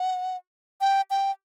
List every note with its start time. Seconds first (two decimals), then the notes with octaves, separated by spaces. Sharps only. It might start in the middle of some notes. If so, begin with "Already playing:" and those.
Already playing: F#5
0.81 G5
1.10 G5